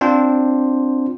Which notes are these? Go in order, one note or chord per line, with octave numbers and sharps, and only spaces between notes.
C4 D4 F4 C5